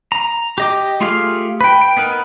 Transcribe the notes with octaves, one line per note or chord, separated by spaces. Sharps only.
A#5
G4 D#5 D6
A3 F4 G4 G#4 F5
B4 G5
G5
B3 D#4 A#4 B4